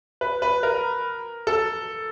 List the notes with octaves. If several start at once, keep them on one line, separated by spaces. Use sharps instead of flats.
B4
B4
A#4
A4